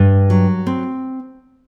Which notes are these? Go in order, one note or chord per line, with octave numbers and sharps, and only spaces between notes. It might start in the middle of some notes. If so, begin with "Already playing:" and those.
Already playing: G2
F#3
C4